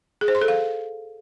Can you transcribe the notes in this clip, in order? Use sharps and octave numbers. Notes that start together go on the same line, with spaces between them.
G#4
C5
C6
A4
F5